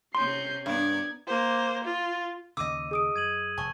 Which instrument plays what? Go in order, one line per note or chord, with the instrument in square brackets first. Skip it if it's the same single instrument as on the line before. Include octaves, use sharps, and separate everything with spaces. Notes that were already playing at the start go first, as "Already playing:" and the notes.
[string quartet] C3 C#4 [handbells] C6 [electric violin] G6 C7
[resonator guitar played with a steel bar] G2 [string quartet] B3 A#4 D5 [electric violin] G#6
[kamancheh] A#3 C5
F4
[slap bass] D#2 C#3 [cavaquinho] D#5 D6 [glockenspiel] E6 D#7
[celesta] G#4 D#6 D7
[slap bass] F#2 [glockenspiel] G#6 D#7 F#7
[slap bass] F1 [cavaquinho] G#5 [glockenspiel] A5 C#6